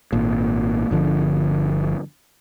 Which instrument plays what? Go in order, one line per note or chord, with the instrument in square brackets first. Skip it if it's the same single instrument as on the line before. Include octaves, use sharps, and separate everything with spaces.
[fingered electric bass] G#1 A#2
G1 D3 F3